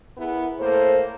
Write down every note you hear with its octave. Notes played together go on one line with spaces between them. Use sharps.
B3 E4 G#4 A#4
A2 A#3 A4 C5